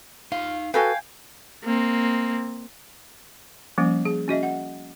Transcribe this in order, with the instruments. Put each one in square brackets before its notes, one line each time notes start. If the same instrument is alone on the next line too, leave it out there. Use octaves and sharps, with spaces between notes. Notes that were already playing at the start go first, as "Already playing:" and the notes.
[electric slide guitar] D#4 F5 [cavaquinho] F4
[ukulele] F#4 A4 B4 [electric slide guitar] F5 [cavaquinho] G5 G#5
[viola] A#3 C4
[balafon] F3 G3 A#3 C#4
G#4
C#4 F#4 D#5 E5
F#5